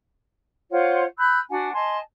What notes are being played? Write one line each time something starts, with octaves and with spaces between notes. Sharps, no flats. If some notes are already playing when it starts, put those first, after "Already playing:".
F4 C5 C#5 F#5
B5 E6 F#6 G6
D4 F#4 F#5 G#5
D#5 G#5 A5 C6